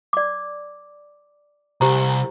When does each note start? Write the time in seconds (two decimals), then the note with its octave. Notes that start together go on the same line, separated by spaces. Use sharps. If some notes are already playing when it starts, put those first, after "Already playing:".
0.13 D5 D6
1.81 C2 G4 C5 A#5